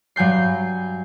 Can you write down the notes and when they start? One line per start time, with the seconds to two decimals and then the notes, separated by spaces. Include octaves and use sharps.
0.16 G2 F#3 G#5 G6 C7